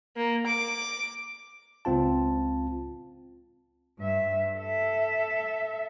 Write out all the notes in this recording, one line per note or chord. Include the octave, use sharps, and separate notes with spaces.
A#3
D6
C#2 C4 F4 A5
G2 E5
A4 E5